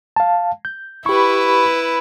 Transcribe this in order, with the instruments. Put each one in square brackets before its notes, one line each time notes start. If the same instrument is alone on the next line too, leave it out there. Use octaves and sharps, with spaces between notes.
[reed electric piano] F5 A5
G6
[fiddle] E4 B4 [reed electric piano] G4 C#6